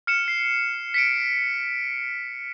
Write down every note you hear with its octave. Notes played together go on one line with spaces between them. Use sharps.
F6 C#7 E7
C7
B6 C#7 D7